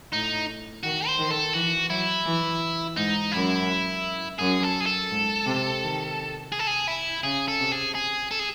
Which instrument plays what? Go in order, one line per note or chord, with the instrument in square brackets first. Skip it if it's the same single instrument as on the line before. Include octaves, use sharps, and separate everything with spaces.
[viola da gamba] A2 [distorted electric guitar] D#4
[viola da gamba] D#3 [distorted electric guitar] F#4
[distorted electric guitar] C5
[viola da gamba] D#3
[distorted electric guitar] A4
[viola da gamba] E3 [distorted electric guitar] F#4
[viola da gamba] F#3 [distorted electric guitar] E4
[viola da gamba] E3
[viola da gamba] G#2 [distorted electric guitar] D#4
[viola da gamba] F#2 [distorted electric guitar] E4
[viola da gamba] F#2 [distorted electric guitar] G#4
[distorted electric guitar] A4
G#4
A4
[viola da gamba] G#2
C3
D#3
[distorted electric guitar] G#4
A4
G#4
E4
[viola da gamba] C#3 [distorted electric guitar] G#4
[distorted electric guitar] A4
[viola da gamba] C3
[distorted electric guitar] G#4
G#4
A4
G#4